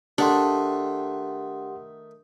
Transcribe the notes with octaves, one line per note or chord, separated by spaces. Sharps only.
D#3 A3 D4 G4 F#5 C6